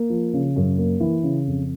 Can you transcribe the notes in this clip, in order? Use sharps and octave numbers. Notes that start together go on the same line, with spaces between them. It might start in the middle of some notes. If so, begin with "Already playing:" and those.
Already playing: A#3
F3
C#3
F#2
A#3
E3
C#3
F2